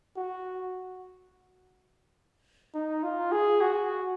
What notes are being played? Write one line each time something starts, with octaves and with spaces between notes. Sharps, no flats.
F#4
D#4
F4
G#4
F#4